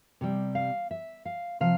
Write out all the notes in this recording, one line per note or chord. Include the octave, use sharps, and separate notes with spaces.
C3 G3
F5
E5
F5
C3 F3 F5